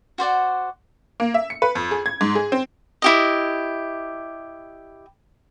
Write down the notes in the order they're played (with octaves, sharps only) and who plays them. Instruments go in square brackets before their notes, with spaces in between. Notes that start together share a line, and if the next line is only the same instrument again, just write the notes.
[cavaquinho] F#4 C5 D5 F#5
[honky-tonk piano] A#3
E5
C#7
B4
F2
G#4
G#6
G#2
G#4
C4
[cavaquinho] E4 G4 D#5